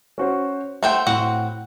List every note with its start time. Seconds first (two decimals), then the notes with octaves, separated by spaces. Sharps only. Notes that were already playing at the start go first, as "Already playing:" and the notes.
0.18 C#4 F#4 C5
0.83 A3 C5 F#5 G5
1.07 A2 C4 F#4 F#5